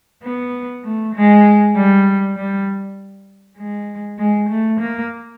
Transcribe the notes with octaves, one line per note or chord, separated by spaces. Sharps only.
B3
A3
G#3
G3
G3
G#3
G#3
A3
A#3